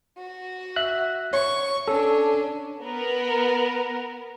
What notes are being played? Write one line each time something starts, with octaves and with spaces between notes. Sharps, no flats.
F#4
E5 F#6
C#5 C#6
C#4 D4 A4
B3 A#4